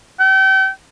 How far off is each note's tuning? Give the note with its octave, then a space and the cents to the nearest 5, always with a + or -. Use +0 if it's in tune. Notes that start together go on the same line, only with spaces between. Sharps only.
G5 -35